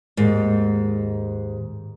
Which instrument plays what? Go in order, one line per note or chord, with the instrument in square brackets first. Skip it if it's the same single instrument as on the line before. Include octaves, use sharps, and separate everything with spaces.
[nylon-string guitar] D#2 G#2